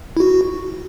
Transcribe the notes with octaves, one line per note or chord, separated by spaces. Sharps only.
E4
F#4